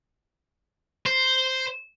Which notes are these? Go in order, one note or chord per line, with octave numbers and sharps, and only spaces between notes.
C5